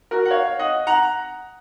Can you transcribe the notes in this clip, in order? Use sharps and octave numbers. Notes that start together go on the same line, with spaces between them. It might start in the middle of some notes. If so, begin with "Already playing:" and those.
F#4 A#4
F#5
C#5 F5
D#5 F#5
F#5 A#5